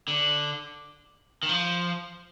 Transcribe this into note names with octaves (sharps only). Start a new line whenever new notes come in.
D3
D#3
F3